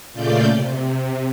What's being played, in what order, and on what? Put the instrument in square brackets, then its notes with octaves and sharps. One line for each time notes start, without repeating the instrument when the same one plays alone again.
[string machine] A#2 C#3 A3 F4 D5 G6
C3